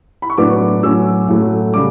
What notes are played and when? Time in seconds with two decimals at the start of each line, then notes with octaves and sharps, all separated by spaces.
0.22 B5
0.30 C#6
0.38 A2 F#3 B3 D4 D6
0.83 A2 F#3 C#4 E6
1.28 A2 F#3 A3
1.74 C#3 G3 D6